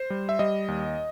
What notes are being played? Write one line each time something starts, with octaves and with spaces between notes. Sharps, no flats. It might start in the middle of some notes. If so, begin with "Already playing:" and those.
Already playing: C5
G3
E5
G3 D#5
D#2